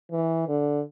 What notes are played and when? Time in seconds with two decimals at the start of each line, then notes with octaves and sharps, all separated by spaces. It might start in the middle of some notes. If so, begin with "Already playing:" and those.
0.11 E3
0.48 D3